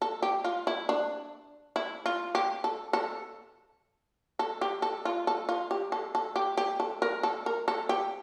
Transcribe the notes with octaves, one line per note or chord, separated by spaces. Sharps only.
A4
G4
F4
E4
D4
E4
F4
G4
A4
A4
A4
G4
A4
F4
A4
F4
G4
A4
A4
G4
G4
A4
A#4
A4
A#4
A4
G4